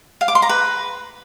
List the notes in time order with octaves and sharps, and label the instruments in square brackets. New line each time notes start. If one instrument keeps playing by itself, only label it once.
[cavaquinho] F5
D6
C6
A#5
B4